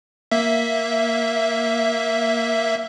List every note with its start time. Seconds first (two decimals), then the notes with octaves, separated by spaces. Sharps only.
0.31 A#3 E5